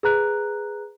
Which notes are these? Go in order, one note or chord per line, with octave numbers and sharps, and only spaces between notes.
G#4 B4 A#5 F#6